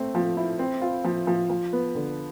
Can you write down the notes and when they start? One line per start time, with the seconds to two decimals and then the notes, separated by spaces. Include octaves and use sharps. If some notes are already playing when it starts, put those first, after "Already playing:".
Already playing: A3 C4
0.15 F3
0.37 E4
0.59 C4
0.82 F4
1.04 F3
1.27 F3
1.50 F3
1.73 B3
1.95 D3